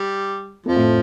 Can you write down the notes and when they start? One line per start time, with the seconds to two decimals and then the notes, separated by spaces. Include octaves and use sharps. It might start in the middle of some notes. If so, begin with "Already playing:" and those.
Already playing: G3
0.66 F2 F3
0.76 A2